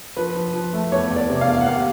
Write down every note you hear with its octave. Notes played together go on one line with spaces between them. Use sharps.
F3 B4
F3
F3
A3
E2 C#5
E2
D5
C3
F5
E2
F#5
D#2 F5